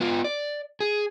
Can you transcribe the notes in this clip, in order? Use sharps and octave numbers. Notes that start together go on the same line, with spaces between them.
B3 F4
D5
G#4